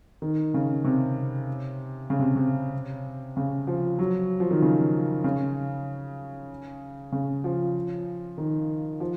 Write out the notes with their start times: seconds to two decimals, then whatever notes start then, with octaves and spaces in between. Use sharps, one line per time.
0.22 D#3
0.54 C#3
0.84 C3
2.10 C#3
2.19 C3
2.36 C3
3.37 C#3
3.67 F3
3.99 F#3
4.40 F3
4.51 D#3
4.62 C#3
5.24 C#3
7.12 C#3
7.44 F3
8.38 D#3
9.00 F3